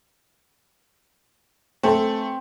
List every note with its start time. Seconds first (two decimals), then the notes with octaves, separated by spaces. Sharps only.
1.83 A3 C4